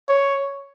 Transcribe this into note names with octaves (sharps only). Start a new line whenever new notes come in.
C#5